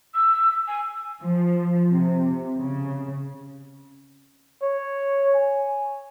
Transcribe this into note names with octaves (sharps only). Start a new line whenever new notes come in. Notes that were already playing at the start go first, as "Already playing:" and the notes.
E6
G#5
F3
C3
C#3
C#5
G#5